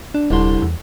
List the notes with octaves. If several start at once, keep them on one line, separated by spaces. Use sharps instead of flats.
D4
D#1 C2 D3 C6
E2